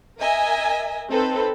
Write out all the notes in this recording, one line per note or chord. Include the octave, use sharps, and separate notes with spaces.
A#4 D#5 E5 G#5
C4 D#4 A4 B4